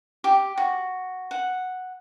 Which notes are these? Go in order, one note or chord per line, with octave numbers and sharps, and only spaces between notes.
G4
F#4
F#5